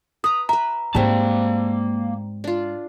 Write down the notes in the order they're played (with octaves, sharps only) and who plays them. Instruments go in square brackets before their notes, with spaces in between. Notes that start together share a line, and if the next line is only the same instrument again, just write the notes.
[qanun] B4 A#5 [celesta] D#6
[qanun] B4 E5 [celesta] A#5
[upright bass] G#2 G#3 [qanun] G3 C4 [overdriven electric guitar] A#3 A5
[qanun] D4 F4